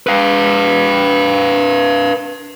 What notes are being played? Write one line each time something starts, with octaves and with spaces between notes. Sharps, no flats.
B4 F5